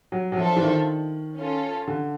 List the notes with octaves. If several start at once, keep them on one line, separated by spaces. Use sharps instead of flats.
F#3
F#3
F3 D4 F4 A4 C5 E5
E3
D#3
C#4 F4 A4
D3